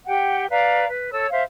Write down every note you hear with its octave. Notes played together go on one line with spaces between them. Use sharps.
G4 F#5 G5
B4 D5 F5 A#5
B4
A4 C#5 E6
C5 E5 F5